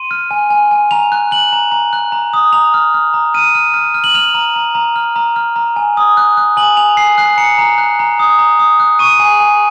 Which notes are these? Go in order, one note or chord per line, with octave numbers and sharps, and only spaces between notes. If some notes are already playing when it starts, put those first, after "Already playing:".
Already playing: C6 D#7
F6
G#5
G#5
G#5
A#5 F7
F#6
F#6 F#7
A#5
A#5
F#6
A#5
D#6
A#5 F7
F6
F6
A#5
F6 D#7
F6
F6
F6
F#7
F6 F7
A#5
A#5
A#5
F6
A#5
F6
A#5
G#5
D#6
F#6
F#6
G#5 F#7
G#5 F7
G#5 C7
F#6 C7
A#5 C#7
A#5
F#6
A#5
D#6
A#5
D#6
F#6
C#6 D#7
G#5
G#5